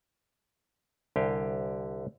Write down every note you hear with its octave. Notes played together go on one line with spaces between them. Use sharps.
C2 D3 G4 F5 G5 G#5